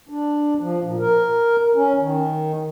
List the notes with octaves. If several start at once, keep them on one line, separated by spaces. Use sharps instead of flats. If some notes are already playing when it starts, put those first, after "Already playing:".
D4
F3
A#2
A#4
C#4
D#3